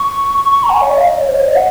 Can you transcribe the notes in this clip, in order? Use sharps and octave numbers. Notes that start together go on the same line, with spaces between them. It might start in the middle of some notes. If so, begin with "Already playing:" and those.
Already playing: C#6
C#6
C#6
A#5
F#5
G#5
C#5
D#5
F5
D#5
C#5
C5
C#5
D#5
F#5